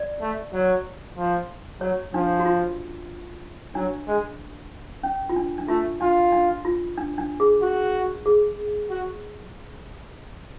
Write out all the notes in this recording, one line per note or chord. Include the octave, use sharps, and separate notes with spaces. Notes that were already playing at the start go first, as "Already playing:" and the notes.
Already playing: D5
A3
F#3
F3
F#3 C#5
F3 D4
F#4
F4
F#3 D4
G#3
C#4
F4
D4
D4
A3 F4
D4 F4
D4
F4
D4
D4
G#4
F#4
G#4
F#4